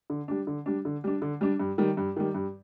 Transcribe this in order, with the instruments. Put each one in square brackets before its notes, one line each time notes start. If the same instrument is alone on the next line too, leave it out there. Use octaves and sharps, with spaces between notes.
[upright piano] D3
G3 D4
D3
G3 D4
D3
G3 D4
D3
G3 D4
G2
D#3 G3
G2
D#3 G3
G2